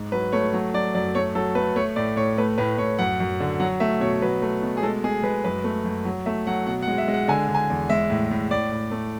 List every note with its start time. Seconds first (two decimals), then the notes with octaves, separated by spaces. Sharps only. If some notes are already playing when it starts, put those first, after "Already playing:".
Already playing: G#2
0.12 F#3 B4
0.32 A3 C#5
0.53 F#3
0.74 F#3 D5
0.95 F#2 D5
1.15 A3 C#5
1.35 F#3 A4
1.55 A3 B4
1.76 A3 C#5
1.96 A2 D5
2.17 A2 C#5
2.38 A3 B4
2.58 A2 B4
2.78 A2 C#5
2.99 F#2 F#5
3.20 F#2
3.40 D3
3.60 F#3 F#5
3.80 A3 E5
4.01 B2 C#5
4.22 F#3 B4
4.42 A3
4.62 B2
4.77 G#4
4.83 G#3 A4
5.04 G#3 G#4
5.23 G#3 B4
5.44 F#2 B4
5.64 A3
5.85 F#2
6.05 F#3
6.26 A3 E5
6.47 F#3 F#5
6.66 B2 F#5
6.82 F#5
6.88 G#3
6.98 E5
7.08 G#3
7.14 F#5
7.28 D3 G#5
7.48 D3
7.55 G#5
7.70 E2
7.90 G#3 E5
8.10 A2
8.31 A2
8.51 A2 D5
8.72 A2
8.92 A3